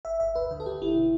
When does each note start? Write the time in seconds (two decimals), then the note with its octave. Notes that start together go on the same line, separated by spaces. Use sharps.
0.05 G1 E5
0.20 G1 E5
0.35 D2 B4
0.51 D3
0.60 A4
0.66 D3 G4
0.81 G1 E4
0.96 B2